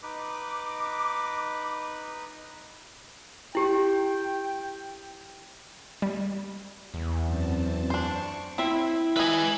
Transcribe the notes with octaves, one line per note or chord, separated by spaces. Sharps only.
D#4 B4 D6
E4 G4 G5
G3
E2
F#2 C4 A5
D4 C5 C#6
C4 E4 E5 B5
G#3 B4 D#5 E5 G#5